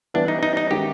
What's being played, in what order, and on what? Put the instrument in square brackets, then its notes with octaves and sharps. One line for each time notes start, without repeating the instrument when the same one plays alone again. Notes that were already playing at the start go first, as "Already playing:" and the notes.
[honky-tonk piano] E3 G3 B3 E4 [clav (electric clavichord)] D4
[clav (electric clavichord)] D#4
D#4
D#4
[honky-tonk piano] D#3 G#3 C#4 F#4 [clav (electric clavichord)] G4